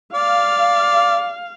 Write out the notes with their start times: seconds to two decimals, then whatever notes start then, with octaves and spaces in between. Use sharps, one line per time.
0.15 D5 F5